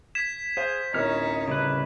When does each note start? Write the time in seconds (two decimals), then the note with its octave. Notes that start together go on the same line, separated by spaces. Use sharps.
0.15 G#6 B6 E7
0.57 G#4 C5 F5
0.94 D1 C#4 D#4 A#4 C#5 F6
1.48 C#3 G3 B4